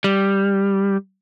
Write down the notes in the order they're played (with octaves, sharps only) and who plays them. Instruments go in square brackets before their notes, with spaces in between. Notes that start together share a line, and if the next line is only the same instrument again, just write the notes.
[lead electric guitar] G3